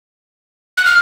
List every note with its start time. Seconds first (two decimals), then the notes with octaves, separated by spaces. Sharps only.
0.77 F#6
0.85 F6